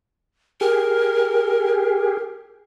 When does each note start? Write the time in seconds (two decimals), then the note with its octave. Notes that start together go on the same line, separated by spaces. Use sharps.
0.61 G4 G#4 A#4